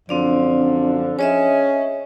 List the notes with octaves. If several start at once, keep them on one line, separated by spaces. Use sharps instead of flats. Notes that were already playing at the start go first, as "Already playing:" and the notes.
F#2 D3 F3 C4 D4 D5
C#4 G#4 C#5 D#5 E5